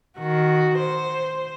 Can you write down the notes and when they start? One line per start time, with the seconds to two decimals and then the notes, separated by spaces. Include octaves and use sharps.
0.18 D#3 F#4
0.79 C5